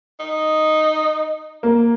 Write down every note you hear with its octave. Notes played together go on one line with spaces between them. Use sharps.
D#4
A#3